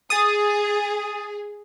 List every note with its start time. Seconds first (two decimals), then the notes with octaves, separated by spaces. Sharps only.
0.10 G#4 D#6 A6